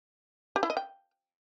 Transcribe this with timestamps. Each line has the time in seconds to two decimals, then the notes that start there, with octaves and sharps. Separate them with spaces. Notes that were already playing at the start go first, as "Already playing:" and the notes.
0.56 G4
0.63 E4
0.70 D#5
0.77 G5